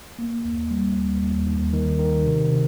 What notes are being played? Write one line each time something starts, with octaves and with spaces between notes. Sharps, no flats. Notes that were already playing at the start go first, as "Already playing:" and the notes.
A#3
D#2
G3
D#2
D#2
D#2
D#3
D#3
C3
C3